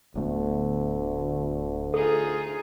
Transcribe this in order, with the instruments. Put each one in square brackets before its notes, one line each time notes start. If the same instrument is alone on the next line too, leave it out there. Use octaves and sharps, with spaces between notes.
[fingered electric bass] D1 A3 B3 [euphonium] D2
[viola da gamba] D#4 F4 G#4 [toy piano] A4